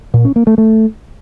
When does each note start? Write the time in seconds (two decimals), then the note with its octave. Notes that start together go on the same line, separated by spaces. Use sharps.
0.14 A#2
0.25 C#4
0.36 A#3
0.47 A3
0.58 A3